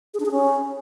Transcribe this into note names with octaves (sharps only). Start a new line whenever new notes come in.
G#4
D4
G#4
C#4